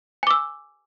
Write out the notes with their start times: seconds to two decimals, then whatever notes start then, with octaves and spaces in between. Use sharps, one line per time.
0.23 G#5
0.27 D6
0.31 E6